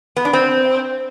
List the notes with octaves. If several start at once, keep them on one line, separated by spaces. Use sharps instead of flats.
B3
D4
C4